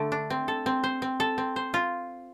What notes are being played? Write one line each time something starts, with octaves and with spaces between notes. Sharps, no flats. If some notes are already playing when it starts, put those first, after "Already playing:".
Already playing: D3 A3
D4
C4
A4
C4
C5
C4
A4
C4
C5
F4